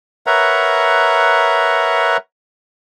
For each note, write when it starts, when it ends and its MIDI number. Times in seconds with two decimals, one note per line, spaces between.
0.27 2.17 70
0.27 2.17 71
0.27 2.17 73
0.27 2.17 76
0.27 2.17 78
0.27 2.17 82